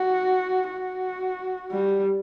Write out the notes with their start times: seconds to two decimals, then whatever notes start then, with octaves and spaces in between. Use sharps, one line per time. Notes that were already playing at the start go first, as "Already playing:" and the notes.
Already playing: F#4
0.70 F#4
1.72 G3